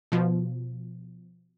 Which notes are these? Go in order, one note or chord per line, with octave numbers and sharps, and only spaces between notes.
B2 F3